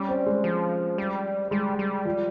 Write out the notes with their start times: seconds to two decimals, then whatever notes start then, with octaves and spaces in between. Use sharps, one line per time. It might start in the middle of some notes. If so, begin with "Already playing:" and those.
Already playing: G3 C#4
0.09 C4
0.26 G#3
0.44 F3
0.98 G3
1.51 G3 G#3
1.79 G3
2.05 F3